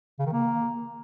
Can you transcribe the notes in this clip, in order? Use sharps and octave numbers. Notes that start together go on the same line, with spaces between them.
C#3
D#3
A#3